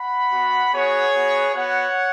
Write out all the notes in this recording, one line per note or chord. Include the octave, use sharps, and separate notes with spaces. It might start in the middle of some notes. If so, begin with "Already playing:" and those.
Already playing: F#5 B5
B3 F#4
B3 F#4 G#4 C#5
B3 F#4
B3 F#4 C#5 F#5